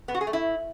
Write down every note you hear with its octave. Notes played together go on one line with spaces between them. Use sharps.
B3
F#4
G#4
A3
E4